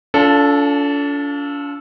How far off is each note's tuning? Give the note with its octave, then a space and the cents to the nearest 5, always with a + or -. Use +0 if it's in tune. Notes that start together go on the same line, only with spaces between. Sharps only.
D4 -45 F4 +0 A4 +0